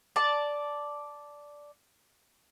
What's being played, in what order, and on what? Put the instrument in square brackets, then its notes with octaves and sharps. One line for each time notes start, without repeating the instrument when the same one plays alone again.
[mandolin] D5 A5